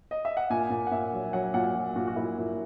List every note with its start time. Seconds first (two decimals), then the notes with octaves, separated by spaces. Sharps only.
0.11 D#5
0.25 E5
0.37 F#5
0.50 A#2 G#5
0.70 A#2
0.87 F#5
0.92 A#2 E5
1.13 F#3
1.33 F#3 F#5
1.54 A#2 F#5
1.75 F#3
1.96 A#2 F#4
2.07 F#4
2.16 A#2 E4
2.38 A#2